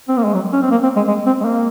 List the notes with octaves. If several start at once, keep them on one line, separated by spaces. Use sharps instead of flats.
C4
A#3
G#3
F#3
C#4
C4
A#3
C4
G#3
G#3
C4
G#3
A#3